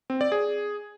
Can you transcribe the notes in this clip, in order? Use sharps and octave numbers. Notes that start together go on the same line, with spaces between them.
C4
D5
G#4